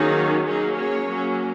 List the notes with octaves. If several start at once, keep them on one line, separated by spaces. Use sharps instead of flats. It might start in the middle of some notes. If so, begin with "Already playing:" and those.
Already playing: D#3 F#3 A#3 C#4 D#4 G#4
F#3 A#3 C#4 D#4 G#4
G#4 C#5
F#3 A#3 C#4